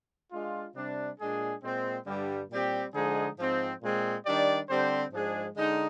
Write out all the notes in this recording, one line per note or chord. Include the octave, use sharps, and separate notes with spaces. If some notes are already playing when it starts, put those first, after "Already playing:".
G#3 D4 F4
C3 G3 D4
A#2 G#3 D4 G#4
A#2 G#3 C4
G2 D3 G3
A#2 G3 C4 G4
D3 F3 G#3 D#4 G#4
G#2 F3 C4
A#2 G#3 C4
D#3 G3 D4 G4 D5
D3 G3 C4 G4 C5
G#2 F3 G#3 D4 G#4
D3 G#3 D#4